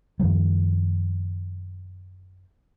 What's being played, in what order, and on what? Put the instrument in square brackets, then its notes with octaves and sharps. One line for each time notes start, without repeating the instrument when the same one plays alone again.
[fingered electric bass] F#2 D#3 F3 G3